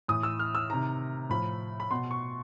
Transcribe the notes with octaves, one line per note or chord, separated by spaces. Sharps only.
A2 E3 D#6
E6
F6
E6
C3 D#3 A#5
A2 F3 B5
B5
B2 C6
C#6